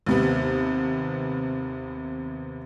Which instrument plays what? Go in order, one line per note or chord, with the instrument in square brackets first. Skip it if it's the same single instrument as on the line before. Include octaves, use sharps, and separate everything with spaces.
[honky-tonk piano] D#2 C3 B3